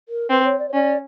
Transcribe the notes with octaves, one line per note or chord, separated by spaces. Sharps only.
A#4
C4 B4
C#5
D5
C#5
C#4 D5